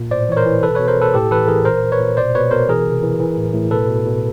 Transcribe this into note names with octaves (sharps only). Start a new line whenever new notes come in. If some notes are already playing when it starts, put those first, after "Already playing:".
Already playing: A#2
A2 C5 D5
E3 C#5
A#4 C5
E3
B2 A4 B4
B2 B4 C#5
A#4 C5
B2 A4 B4
A2 G4 A4
E3 A4 B4
E3 G#4 A#4
A#2 A#4 C5
A#2
B4 C#5
A#2
B2 C5 D5
B2 B4 C#5
B2 A#4 C5
E3 G#4 A#4
C3
E3
E3
A2
A2
B2 A4 B4
B2
B2